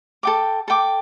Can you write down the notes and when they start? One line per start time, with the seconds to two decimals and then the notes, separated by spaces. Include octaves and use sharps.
0.23 A4 G5 D6
0.68 A4 G5 D6